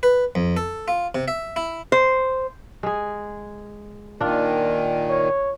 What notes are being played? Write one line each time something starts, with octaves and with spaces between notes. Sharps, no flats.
B4
F2
A4
F4
C3
E5
E4
C5
G#3 G#4
A#2 D#3 D4 F4
C#5